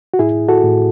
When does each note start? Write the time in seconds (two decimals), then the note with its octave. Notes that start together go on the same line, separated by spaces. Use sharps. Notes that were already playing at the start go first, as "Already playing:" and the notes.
0.14 F#4
0.19 A2 E4 G#4
0.49 F#4 A4
0.63 A2